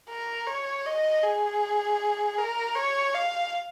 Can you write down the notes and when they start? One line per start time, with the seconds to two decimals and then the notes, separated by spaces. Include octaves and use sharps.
0.10 A#4
0.47 C#5
0.86 D#5
1.23 G#4
2.38 A#4
2.75 C#5
3.15 F5